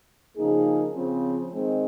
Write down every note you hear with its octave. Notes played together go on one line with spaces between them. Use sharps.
C#3 F3 A#3 D#4 G#4
C#3 F3 C4
D#3 G#3 C4